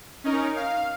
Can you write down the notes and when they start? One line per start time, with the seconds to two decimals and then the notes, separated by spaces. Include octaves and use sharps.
0.24 C#4 D#4 A#4
0.56 F5